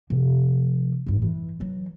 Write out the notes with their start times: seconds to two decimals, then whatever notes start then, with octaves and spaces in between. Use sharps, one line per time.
0.10 C3 F3
1.06 A1 G2
1.22 E3
1.60 E3 F#3